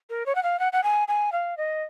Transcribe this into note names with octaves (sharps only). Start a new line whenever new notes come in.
A#4
C#5
F#5
F5
F#5
F#5
G#5
G#5
F5
D#5